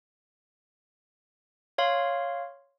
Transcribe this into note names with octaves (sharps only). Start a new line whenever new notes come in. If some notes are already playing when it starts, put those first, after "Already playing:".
C#5 F5 C6